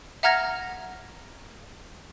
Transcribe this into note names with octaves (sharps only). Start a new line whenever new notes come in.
E5 F#5 A#5 F6 G#6 A#6